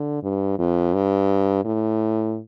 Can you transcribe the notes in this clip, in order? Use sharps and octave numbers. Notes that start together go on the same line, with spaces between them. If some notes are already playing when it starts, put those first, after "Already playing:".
Already playing: D3
G2
F2
G2
A2